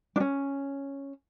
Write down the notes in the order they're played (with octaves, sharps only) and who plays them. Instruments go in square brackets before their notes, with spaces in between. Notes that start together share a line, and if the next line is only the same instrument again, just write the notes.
[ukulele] C#4 D4